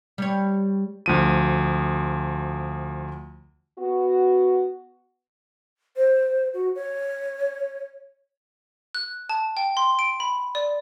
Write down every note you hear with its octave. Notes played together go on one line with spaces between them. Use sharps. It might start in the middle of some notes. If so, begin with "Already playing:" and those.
G3 C#5
D2 F3 D#7
B3 F#4
C5
F#4
C#5
F#6
A5
G5
C6
D7
B5
D5